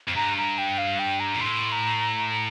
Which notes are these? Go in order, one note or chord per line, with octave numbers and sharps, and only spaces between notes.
F2
G2 A#5
A#5
G5
F5
G5
A#5
A#2
A2 C6
A#5